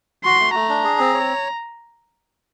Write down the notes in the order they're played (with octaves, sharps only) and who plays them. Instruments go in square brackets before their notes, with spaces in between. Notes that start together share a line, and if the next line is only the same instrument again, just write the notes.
[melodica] F#4 [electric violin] C6
[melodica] A3
[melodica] A3 [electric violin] A#5
[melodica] D4
G#4
C4
C#5